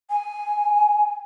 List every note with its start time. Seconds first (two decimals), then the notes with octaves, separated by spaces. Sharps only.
0.10 G#5